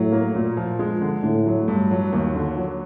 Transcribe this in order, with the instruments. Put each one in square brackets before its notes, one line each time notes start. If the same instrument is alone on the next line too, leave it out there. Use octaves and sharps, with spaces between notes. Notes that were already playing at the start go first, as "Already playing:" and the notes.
Already playing: [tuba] A2 [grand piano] F#3
[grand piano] A#3
A#2
F3
G#3
D3
[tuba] A2 [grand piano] D3
[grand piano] F#3
G2
F#3
D#2
D3
F#3